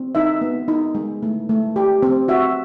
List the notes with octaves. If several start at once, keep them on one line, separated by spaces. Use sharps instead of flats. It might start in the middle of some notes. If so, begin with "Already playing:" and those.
Already playing: C4
D#4 E5
B3
D#4
G#3
A3
A3
G4
C4
F#4 E5